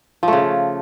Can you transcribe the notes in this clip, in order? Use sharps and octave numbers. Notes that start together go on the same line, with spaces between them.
C#3 F3 A3